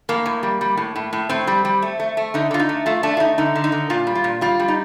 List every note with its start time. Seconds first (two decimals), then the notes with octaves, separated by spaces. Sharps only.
0.09 A2 A#3
0.26 A2
0.43 G3
0.61 G3
0.77 A2
0.96 A2
1.13 A2
1.29 A2 C4
1.47 G3
1.65 G3
1.82 A3
1.99 A3
2.17 A3
2.34 D3 D#4
2.51 D3 F4
2.59 D#4
2.69 A3
2.86 A3 F4
3.03 A3 D4
3.17 F4
3.20 A3 D#4
3.38 D3 D#4
3.55 D3
3.64 D#4
3.72 D3
3.90 A#2 F4
4.07 G3
4.15 F4
4.24 A#2
4.41 G3 F4
4.59 G3
4.68 D#4